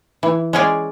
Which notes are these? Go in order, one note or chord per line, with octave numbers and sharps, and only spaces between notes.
E3
G#3 C#4 G#4 D5